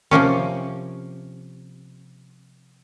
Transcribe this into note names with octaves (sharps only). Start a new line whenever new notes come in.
C3 F3 A#3 C#4